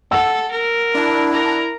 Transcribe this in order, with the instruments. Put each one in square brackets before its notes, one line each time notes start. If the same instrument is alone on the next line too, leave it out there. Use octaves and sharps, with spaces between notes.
[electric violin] A4 [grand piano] F#5 E6
[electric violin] A#4
[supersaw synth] D4 [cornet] E4
[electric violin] A#4 A#5